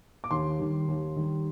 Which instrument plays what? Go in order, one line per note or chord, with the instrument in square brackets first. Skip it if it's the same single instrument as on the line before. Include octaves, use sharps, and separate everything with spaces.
[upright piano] D6
D#2 C6
D#3 G3
D#2
D#3 G3